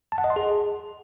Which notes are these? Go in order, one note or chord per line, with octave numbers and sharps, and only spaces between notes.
A5
F#5
D#5
C6
G#4